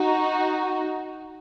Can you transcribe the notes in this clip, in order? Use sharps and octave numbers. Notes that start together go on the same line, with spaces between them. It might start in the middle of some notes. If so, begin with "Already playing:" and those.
Already playing: D#4 F#4